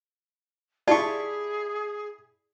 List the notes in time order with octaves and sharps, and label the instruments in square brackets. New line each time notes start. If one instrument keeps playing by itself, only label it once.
[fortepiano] E4 G4 [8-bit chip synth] F4 C#6 [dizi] G#4 [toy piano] D5 A5